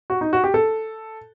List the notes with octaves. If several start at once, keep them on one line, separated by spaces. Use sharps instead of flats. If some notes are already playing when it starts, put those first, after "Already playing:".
F#4
D#4
F#4
G4
A4